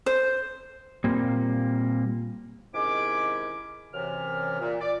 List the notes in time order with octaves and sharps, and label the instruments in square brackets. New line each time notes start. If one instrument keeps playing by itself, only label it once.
[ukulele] C5
[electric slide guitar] A#2 G3 A#3 C4
[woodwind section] C3 D#3 G#3 C#4 E4 D6
F#2 C3 E3 F6
A#2
D5